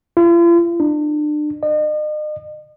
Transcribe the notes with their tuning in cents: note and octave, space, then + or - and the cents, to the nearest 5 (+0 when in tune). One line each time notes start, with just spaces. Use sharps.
F4 -45
D4 +35
D#5 -40